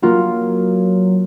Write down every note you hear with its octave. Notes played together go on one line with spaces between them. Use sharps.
F#3 A#3 F4 F#4